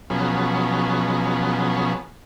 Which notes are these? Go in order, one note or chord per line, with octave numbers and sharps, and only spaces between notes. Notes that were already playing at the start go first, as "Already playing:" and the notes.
B2 F3 F#3 B3 C#4 G#4